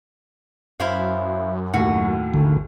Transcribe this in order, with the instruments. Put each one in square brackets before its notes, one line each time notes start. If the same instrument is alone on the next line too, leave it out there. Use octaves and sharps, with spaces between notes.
[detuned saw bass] F#2 [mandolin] E4 C5 F5
[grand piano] D#2 A2 [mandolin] F#4
[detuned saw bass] G#1 [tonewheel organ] D3